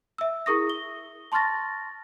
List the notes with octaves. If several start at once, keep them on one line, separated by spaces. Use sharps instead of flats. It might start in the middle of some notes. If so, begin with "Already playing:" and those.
E5 E6
E4 G#4 A#4 C#6 D#6 A#6
G7
A5 C6 C#6 F6 A6 A#6